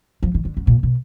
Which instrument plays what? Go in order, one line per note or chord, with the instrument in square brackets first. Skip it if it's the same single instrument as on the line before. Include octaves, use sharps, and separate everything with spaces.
[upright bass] F3
D#3
D3
F#2
A#2
B2